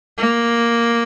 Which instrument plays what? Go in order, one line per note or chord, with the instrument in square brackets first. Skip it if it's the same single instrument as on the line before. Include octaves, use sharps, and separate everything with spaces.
[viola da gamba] A#3